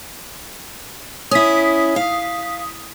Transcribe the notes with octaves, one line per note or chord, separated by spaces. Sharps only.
C#4 E4 D#6 B6
F5